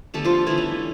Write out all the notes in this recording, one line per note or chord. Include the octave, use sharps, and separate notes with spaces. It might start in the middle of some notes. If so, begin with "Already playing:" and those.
D3 G3 A3 B3 A4
F3 F4
D3 E3 G3 B3 E4
C#4